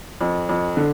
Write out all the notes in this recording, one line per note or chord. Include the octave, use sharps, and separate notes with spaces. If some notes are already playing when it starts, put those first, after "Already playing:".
F2
F2
D3